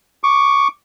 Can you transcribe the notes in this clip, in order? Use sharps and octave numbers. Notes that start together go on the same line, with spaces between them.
C#6 D6